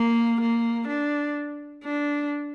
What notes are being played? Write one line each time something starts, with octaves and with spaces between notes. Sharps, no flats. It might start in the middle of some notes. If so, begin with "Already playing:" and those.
Already playing: A#3
A#3
D4
D4